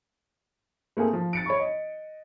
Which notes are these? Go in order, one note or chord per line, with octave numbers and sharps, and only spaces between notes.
A3 A#3 C4 G#4
F3
A6 C#7 D7
C#5 B5 C#6
D#5